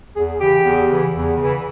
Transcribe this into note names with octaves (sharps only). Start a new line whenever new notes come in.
E2 G#4
C#3 E3 G4
E2
C#3 E3
E2
C#3 E3